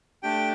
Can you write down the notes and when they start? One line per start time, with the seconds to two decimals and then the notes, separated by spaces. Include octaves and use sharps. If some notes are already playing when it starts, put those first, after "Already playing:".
0.23 A3 D4 G4 G5